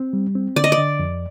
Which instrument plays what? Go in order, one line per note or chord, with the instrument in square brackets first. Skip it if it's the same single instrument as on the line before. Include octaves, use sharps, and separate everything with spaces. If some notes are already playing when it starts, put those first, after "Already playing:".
Already playing: [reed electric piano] C4
G3
C4
[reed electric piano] D3 [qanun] D5
[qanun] D#5
D5
[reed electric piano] D3
F2